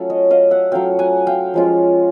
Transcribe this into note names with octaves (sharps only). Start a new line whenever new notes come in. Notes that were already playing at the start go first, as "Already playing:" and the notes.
Already playing: F#3 A3 C#4 F4
C#5 D#5
D#5 F5
E5 F#5
F#3 A3 C#4 F4 F5 G5
F#5 G#5
F5 G5
F3 G#3 C#4 F4